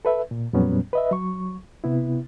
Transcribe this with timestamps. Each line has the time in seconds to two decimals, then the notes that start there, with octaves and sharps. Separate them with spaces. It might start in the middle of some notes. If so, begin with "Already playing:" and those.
0.05 A4 B4 E5
0.31 A#2
0.53 F2 A#2 F#3 G3 B3 C#4
0.93 B4 D#5 E5
1.11 F#3 C#6
1.84 C3 B3 E4